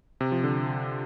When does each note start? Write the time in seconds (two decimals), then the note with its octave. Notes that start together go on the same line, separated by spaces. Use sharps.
0.21 C3
0.32 F3
0.44 D3